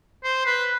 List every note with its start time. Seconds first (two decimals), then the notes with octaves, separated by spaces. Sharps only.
0.24 C5
0.46 B4